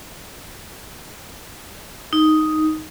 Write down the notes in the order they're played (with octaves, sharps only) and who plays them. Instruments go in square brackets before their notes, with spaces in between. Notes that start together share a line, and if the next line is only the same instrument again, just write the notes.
[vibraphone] D#4